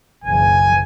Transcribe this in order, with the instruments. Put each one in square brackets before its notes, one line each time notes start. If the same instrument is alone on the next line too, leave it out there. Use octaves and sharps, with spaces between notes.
[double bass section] F#1 B1 E3 [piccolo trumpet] G#5